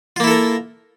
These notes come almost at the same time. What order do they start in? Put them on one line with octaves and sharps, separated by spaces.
F4 A#3 E4 A4 A#4